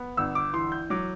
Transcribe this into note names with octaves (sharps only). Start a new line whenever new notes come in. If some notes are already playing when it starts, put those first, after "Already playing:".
Already playing: B3
G1 E6
D6
E3 C6
G6
F#3 D6